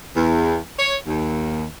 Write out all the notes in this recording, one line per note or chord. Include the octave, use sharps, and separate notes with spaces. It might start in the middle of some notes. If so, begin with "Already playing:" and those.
E2
C#5
D#2